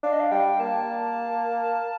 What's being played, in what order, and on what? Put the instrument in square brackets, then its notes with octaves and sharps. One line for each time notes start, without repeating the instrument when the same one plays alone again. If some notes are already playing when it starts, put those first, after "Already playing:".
[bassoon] D4 [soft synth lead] F5
[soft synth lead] D#5
F5
[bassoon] G3 [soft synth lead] G5
[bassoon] A#3 [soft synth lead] A5